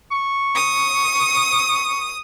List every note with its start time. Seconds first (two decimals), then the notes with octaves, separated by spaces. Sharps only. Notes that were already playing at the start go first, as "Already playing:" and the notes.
0.12 C#6
0.56 D#6